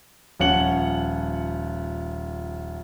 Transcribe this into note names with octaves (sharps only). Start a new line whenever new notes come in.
D#1 F3 C#4 F#5 C#7 F#7